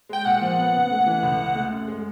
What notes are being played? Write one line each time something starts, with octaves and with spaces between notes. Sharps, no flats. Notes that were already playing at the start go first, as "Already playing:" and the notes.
G#3 G5
A#2 F#5
F3
B3
C#3
A3
E3
C#2
C#3
A3
F#2
G#3